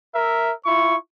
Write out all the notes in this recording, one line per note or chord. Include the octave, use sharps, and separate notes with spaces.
A#4 E5
E4 F4 C#6